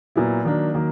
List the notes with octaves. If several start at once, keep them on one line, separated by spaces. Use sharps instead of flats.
A#2 F#3 B3 E4
D#3 F#3 A#3 D4
D#3 F#3 A#3